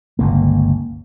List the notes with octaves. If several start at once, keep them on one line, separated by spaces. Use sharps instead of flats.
G1 C#2 A#3